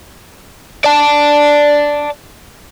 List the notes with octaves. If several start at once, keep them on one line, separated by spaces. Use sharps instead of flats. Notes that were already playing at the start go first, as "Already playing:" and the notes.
D5 A5